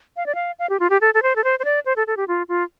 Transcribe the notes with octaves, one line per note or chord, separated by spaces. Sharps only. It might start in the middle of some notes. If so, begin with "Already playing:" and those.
F5
D5
F5
F5
G4
F4
G4
A4
A4
C5
A4
C5
C5
D5
C5
A4
A4
G4
F4
F4